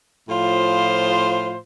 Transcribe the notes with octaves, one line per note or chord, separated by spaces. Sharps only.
A2 F3 F4 C5